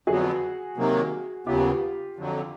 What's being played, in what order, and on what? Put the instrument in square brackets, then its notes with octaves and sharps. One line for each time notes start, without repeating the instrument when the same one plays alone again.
[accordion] F2 D3 F#3 B3 [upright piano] F#4 G#4
[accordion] C3 D#3 F#3 A#3
[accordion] D#2 C#3 F#3 B3 [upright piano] F4 G4
[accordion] F2 D3 F#3